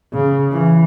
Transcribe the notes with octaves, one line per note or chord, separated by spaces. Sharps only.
C#3
E3